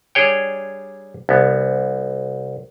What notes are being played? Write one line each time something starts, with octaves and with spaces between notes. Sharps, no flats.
G3 D4 G#4 C#5 G5
C2 B3